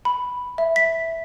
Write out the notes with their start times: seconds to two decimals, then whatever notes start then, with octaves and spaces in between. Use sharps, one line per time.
0.05 B5
0.58 E5
0.76 B6